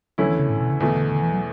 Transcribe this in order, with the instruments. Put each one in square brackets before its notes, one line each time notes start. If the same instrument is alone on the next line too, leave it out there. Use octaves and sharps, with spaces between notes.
[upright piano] E2 D3 A3 C#4 E4 [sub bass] F#3
[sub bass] E3
C#3
A2
B2
C#3
[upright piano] E2 B2 A3 [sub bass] D3
[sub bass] D3
D3
E3
F#3